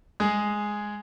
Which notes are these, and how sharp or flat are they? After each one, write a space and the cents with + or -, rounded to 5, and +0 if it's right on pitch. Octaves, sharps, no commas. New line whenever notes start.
G#3 +0 G#4 +0